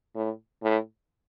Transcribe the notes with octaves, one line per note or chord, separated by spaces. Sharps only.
A2
A2